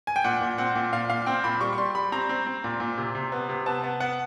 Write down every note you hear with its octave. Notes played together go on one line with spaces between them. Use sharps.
G#5
G5
A#2 F#5
A#2
C4 F#5
A#2
A#2 F5
A#2 F5
C4 G5
A#2 B5
G3 C#6
C#6
G3 C6
G3 B5
C4 A#5
C4
C4
A#2
A#2
C3
C3
B3
C3
B3 A5
B3
B3 F#5